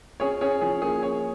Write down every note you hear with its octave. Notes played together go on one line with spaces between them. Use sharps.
C#4 G#4 C#5
C#4 G#4 C#5
F3 G#4
A#3 G#4
C#4 G#4 C#5